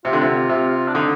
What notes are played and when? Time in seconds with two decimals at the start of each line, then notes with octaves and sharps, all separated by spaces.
0.05 C3 F4
0.13 D3
0.22 C3
0.49 C3
0.88 D4
0.94 D3 D#4